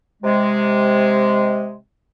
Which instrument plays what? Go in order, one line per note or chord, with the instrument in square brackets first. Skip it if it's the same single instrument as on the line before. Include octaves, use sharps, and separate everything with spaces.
[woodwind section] C3 G#3